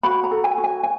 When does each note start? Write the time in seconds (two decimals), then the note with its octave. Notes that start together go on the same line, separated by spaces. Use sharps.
0.03 F#4 B5
0.24 A#5
0.31 A4
0.44 G#5
0.58 F#4
0.64 G#5
0.83 G#5